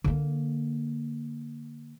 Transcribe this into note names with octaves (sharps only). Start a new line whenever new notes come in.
D3 A#3